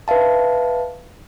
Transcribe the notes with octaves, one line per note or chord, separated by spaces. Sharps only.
B4 E5 F5 A5